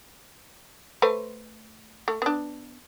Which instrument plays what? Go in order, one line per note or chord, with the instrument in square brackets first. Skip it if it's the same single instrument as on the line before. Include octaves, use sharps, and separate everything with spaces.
[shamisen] A3 B4 C5
A3
B3 D4